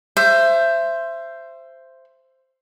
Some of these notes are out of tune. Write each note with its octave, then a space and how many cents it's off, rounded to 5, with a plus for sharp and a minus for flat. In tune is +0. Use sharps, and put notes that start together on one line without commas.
C5 +0 E5 +25